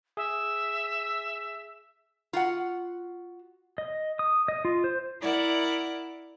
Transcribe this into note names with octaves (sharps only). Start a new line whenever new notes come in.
G#4 E5
F4 F#4 F#5
D#5
D#6
D#5
F4
C5
E4 A#4 D5 F#5